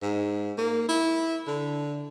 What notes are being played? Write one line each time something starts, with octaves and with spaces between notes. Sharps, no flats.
G#2
A#3
E4
D3